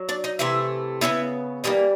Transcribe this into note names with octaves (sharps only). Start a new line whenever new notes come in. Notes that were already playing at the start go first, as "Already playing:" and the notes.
Already playing: F#3
D4 D5
D#4 D#5
C3 E3 A3 E4 E5
C#3 F#3 B3 E4 E5
E3 G3 A#3 D#4 D#5